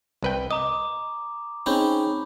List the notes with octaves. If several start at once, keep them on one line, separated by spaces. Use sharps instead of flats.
C2 B4 G5
D#5 A#5 D6 D#6
C4 C#4 D#4 G#4 B5 G6